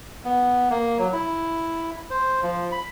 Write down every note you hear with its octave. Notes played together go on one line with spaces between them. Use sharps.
B3
A#3
F#3
E4
C5
F3
B5